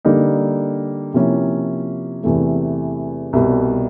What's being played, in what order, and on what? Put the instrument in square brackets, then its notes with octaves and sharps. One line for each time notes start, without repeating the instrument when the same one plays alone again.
[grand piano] D3 G3 A#3 D#4
C3 F3 A#3 C#4 E4
E2 C3 E3 A3
C2 B2 G3